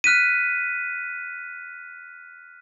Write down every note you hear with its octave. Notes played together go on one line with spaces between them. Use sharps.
F6 F#6 B6 D#7